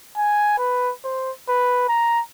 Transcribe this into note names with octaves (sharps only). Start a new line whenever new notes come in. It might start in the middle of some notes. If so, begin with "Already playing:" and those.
G#5
B4
C5
B4
A#5